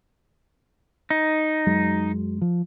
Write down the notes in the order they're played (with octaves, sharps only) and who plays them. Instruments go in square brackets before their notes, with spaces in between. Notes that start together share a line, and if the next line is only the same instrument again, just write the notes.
[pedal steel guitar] D#4
[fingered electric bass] F#2 F#3 G#3
F3